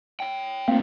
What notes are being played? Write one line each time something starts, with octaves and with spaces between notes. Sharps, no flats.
C#5 G5
A3 A#3 C4 F4